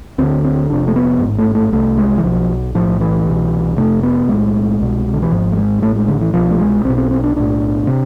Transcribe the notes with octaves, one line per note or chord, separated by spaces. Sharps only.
D2 D3 C4
C4
F1 F2 C3 D4
A3
B3
A1 G#2
A3
A3
C2 C3 A3
G#3
E3
B1 B2 F3
B1 A2 F3
E3
C2 B2
F1 F2 C3 A3
B3
B1 A2 G#3
C2 B2
D3
E3
G#1 G#2 F3
A3
G#3
A1 A2 A3
G#3
D3
E3
C2 B2 F3
A3
G#3
B1 B2 C4
C4
C4
D4
B1 A2 D4
C3